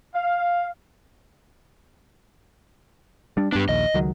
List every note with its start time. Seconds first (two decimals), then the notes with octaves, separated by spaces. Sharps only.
0.14 F5
3.37 G3 D4
3.52 G2 B3 D4 G4
3.69 A#1 D#2 D#5
3.94 C#2 D#3 F#3